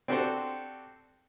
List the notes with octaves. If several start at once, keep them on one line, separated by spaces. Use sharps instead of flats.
C4 D4 F#4 G4 A4 C5